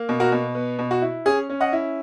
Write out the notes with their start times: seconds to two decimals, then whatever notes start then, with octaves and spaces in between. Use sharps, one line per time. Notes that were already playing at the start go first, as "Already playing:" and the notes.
Already playing: A#3
0.09 B2
0.20 F#4 A#4
0.32 B2
0.55 B3
0.79 B2
0.91 F#4
1.02 E4
1.25 C#4 G#4
1.49 C#4
1.61 D#5 F#5
1.73 E4